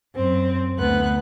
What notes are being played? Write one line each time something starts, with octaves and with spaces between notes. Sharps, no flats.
F#2 C4
D2 B3 F#6